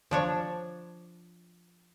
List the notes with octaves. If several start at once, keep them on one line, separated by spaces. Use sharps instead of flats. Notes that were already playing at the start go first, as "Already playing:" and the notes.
F3 D4 C#5